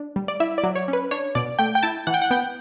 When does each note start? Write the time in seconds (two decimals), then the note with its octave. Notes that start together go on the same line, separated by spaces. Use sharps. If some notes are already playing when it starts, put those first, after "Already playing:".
Already playing: D4
0.16 G3
0.28 D5
0.40 E4 E5
0.58 D5
0.64 F#3
0.75 C#5
0.88 C#4
0.93 B4
1.11 D4 C#5
1.35 B2 D5
1.59 A3 G5
1.75 G5
1.83 E4 A5
2.07 E3 F#5
2.14 G5
2.22 F#5
2.31 B3 G5